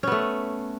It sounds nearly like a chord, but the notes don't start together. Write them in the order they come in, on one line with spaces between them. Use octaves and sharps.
C#4 B3 A3